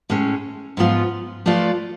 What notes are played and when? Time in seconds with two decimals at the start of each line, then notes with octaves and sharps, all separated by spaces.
0.10 A2 G#3 C#4
0.77 G#2 F3 B3 F4
1.46 F3 A3 F4 B4 D5